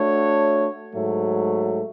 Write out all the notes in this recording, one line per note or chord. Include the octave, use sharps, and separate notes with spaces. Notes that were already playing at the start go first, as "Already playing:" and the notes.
Already playing: A3 D4 F#4 C#5
G#2 F#3 A3